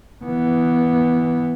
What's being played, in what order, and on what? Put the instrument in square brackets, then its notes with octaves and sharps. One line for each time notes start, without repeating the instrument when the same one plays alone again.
[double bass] E3 B3